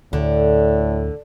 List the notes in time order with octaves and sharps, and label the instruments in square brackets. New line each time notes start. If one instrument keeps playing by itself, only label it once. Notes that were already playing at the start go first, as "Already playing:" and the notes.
[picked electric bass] D2 [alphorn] A2 [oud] D3